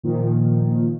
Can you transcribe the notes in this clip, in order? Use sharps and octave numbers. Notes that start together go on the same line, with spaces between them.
A#2 D#3 F3